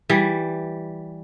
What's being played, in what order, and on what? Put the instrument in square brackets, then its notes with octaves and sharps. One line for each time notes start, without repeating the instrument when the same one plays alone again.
[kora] E3 G3